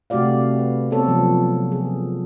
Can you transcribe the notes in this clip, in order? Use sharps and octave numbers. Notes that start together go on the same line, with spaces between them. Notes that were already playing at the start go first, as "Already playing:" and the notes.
C3 A3 F#4 G4 D5 F5
B4
B3 C4 A4 C#5
C3 F3 F#3
G#4